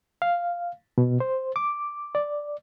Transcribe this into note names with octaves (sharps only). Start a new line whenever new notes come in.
F5
B2
C5
D6
D5